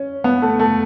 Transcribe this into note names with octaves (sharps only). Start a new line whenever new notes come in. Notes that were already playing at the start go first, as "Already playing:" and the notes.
Already playing: C#4
B3
A3
A3